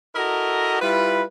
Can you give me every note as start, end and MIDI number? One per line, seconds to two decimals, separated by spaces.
0.16 0.81 64
0.16 0.81 66
0.16 0.81 69
0.16 0.81 70
0.16 0.81 75
0.16 0.81 82
0.82 1.23 55
0.82 1.23 64
0.82 1.23 65
0.82 1.23 71